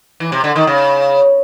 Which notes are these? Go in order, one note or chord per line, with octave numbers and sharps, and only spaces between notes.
E3
C3
D3
D#3
C#3